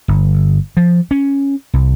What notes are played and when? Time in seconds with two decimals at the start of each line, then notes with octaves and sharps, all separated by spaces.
0.08 G1
0.77 F3
1.11 C#4
1.73 C2